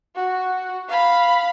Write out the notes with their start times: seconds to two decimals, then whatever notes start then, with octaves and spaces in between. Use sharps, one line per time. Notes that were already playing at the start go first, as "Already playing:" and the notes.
0.15 F#4
0.89 F5 B5